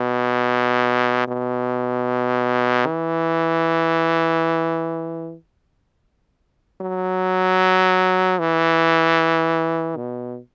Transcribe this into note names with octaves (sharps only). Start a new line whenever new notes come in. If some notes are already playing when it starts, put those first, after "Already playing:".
Already playing: B2
B2
E3
F#3
E3
B2